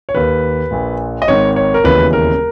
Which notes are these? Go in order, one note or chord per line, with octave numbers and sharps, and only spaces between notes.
C#5
D#2 D#3 B4
A#1 A#2
D#5
G#1 G#2 D#3 C#5
C#5
A#4
E1 D#2 C#3 E3 B4
A#4